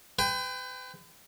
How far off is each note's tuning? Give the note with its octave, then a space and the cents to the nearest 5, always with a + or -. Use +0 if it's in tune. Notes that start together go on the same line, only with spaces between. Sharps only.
B4 +40 G5 +15